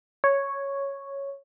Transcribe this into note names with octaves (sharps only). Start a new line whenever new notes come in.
C#5